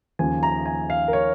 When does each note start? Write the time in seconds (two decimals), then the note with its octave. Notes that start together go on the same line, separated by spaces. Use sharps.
0.19 D#2 C#3 F3 G#5
0.43 A#5
0.66 G#5
0.90 F5
1.08 A#4
1.13 C#5